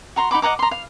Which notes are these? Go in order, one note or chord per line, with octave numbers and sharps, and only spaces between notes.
F#4 A#5 C6
D#4 F#5 B5 D6
D#5 F#5 A#5 D6
A#5 C6
F5